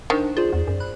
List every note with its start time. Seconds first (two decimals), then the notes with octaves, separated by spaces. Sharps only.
0.10 D#3 D4 C5
0.37 F4 G#4 C5 D5
0.53 E2
0.67 F#2
0.80 B5 F#6